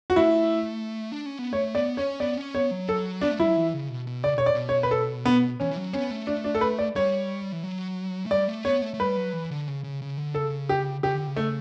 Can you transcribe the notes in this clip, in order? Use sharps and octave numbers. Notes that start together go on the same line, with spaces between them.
F#4
A3 E4
D4
C#4
B3
A3 C#5
B3 D5
C#4 C#5
B3 D5
C#4
B3 C#5
F#3
A4
B3 D4
A3
G3 E4
F#3
E3
C#3
B2
B2
C#3 D5
B2 C#5
D5
B2
C#5
B4
A4
B3
E3 C#4
E3
F#3
B3 C#4
A3
D4
D4
A4
B4
D5
G3 C#5
E3
F#3
A3
G3 D5
A3
B3 C#5
A3
A3
G3 B4
F#3
E3
D3
C#3
C#3
C#3
D3
C#3 A4
G4
C#3 G4
D3
C#3
A3